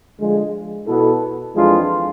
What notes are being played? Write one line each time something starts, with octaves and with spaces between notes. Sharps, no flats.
D3 F3 G#3
B2 B3 E4 A4
F2 E3 G#3 D4 F4